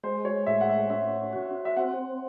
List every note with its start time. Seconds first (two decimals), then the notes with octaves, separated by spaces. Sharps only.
0.04 G#3 C5
0.25 C#5
0.46 A2 E5
0.61 F#5
0.69 E5
0.90 C#4 E5
1.33 F#4
1.65 E5
1.77 C4 F#5